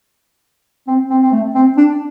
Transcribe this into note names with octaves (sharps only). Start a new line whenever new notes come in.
C4
C4
C4
A3
C4
D4